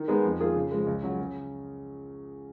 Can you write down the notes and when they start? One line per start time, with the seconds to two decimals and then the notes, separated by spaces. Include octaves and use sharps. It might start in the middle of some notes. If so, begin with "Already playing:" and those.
Already playing: D#3
0.08 G#3 B3 D#4 G#4
0.24 F2
0.40 D#3 A#3 F4 G#4
0.55 C#3
0.72 F3 G#3
0.87 C#2
1.03 C#3 F#3
1.19 C#3